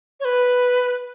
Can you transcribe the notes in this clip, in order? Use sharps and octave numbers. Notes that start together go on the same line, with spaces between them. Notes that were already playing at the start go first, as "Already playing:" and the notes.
C#5
B4